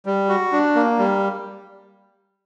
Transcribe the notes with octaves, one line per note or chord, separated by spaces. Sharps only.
G3
F#4
D4
A#3
G3